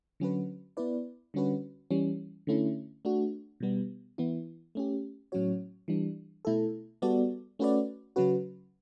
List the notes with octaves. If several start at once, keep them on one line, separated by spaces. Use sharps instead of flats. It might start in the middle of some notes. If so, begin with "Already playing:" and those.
D3 F#3 C#4 F#4 B4
B3 E4 B4 D5
D3 G3 C#4 F#4 B4
E3 G3 C#4
D3 A3 C#4 E4
A3 D4 F#4
B2 G3 B3
E3 B3 E4
A3 C#4 G4
A2 F#3 C#4 F#4 C#5
E3 G3 D4
B2 A3 E4 A4
G3 B3 F#4 A4 D5
A3 C#4 F#4 B4 D5
C#3 F#3 C#4 F#4 B4